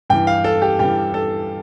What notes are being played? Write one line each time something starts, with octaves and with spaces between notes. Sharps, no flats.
G2 E3 G5
F5
A4
G4
G2 E3 G4
A4